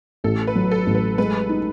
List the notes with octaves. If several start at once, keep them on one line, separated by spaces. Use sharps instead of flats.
A1 A4
B4
F#3
A4
A1
B4
G#3 B4
D#4